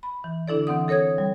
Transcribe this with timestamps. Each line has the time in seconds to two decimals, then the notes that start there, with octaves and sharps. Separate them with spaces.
0.03 B5
0.24 E3
0.48 D3 D4 E4 A4 D5
0.67 E3 C4 F#5 D#6
0.88 A4 A#4 C#5 D#6 G#6
1.18 G3